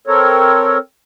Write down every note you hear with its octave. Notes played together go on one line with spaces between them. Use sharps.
C4 A4 A#4 C#5